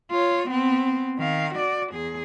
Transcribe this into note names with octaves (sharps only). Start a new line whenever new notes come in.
F4 C#5
B3 C4
D#3 F5
F#4 D5
E2 G#4